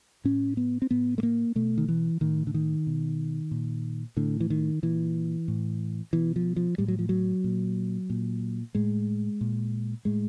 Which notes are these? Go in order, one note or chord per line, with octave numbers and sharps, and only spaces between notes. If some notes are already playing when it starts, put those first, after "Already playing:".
A2 C#4
B3
C4
A2 B3
A3
A#3
B2 A3
D#3
E3
A2 D#3
D3
D#3
B2
A#2
A2 D3
E3
D#3
A#2 E3
A2
B2 E3
F3
F3
A2 G3
F#3
F3
F#3
A#2
A#2
A2 G#3
A#2
A2 G#3